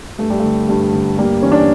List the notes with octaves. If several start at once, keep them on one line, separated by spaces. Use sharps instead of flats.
G2 A3
G3
D3 A3
G2
D3
G2 G3 A#3
E3 C#4
D4